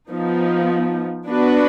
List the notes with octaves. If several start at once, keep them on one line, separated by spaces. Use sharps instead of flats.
F3 B3 D#4
B3 D4 F#4 B4